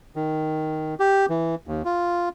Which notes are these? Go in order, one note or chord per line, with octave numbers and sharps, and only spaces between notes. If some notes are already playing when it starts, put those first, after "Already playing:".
D#3
G4
E3
D#2
F4